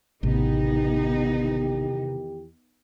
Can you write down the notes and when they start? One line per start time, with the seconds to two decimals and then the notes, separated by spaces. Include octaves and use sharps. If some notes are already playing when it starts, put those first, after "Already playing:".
0.23 A1 E2 C3 D#3 B3 D#4 G4